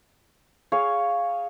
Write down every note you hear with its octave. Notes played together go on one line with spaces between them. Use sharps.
G#4 C#5 F5